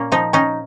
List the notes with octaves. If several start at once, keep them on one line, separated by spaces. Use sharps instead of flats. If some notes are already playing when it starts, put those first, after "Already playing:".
Already playing: A#2 A#3 C#4
F3 D#4
C#4 D#4